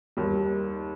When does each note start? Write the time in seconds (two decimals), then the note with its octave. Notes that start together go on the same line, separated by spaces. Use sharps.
0.17 D#2 D#3 G3